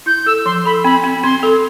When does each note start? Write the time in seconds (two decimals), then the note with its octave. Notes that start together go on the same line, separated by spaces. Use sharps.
0.06 E4 G6
0.26 A4 E6
0.45 F3 C6
0.65 A4 B5
0.84 C4 B5
1.04 C4
1.23 C4 C6
1.43 A4